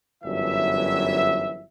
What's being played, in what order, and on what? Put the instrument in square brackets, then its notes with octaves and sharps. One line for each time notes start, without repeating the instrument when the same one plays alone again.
[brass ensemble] G1 F#2 E3 F#3 E5